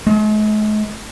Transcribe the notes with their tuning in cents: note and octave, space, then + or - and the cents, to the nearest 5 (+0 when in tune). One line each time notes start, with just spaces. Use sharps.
G#3 +45